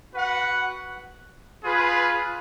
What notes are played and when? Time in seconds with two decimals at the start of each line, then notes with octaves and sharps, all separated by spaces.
0.14 F#4 B4 F#5
1.63 F4 G#4 B4